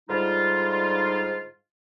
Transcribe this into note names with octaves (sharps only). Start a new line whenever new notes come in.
G#2 D3 G3 D#4 F4